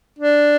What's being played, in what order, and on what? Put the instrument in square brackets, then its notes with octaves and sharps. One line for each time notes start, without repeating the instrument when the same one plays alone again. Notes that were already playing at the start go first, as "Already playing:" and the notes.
[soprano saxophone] D4